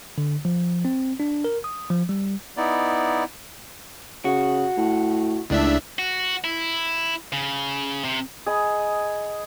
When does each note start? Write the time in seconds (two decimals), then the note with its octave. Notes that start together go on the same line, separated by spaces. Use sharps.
0.18 D3
0.45 F3
0.85 C4
1.20 D4
1.44 A#4
1.64 D#6
1.90 F3
2.09 G3
2.57 B3 D#4 E4 D5
4.25 C#3 F#4
4.77 A2
5.50 C#2 A2 D4 E5
5.99 F#4
6.44 E4
7.32 C#3
8.04 C3
8.46 G#4 D#5 B5